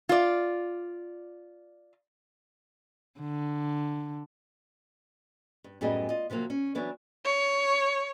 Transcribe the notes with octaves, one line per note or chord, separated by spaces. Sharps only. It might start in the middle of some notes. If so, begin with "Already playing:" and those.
F4 D5
D3
G2
F#2 A2 G3 B3 G#4 D#5
F4 D#5
C3 F3 F#3 A#3
C#4
E3 F#3 B3 D4 C#5
C#5